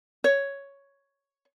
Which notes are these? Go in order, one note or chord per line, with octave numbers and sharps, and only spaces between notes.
C#5